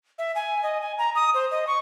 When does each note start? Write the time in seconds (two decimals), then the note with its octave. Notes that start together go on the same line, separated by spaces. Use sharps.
0.19 E5
0.35 G#5
0.63 D#5
0.82 G#5
0.98 A#5
1.15 D#6
1.34 C5
1.51 D#5
1.67 C#6